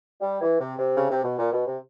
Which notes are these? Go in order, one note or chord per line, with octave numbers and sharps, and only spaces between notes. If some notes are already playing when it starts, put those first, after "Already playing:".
G3
E3
C3
C3
C#3
C3
B2
A#2
B2
C3